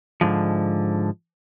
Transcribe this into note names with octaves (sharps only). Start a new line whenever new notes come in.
G#2 D3 F3